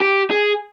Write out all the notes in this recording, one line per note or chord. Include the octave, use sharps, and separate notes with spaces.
G4
G#4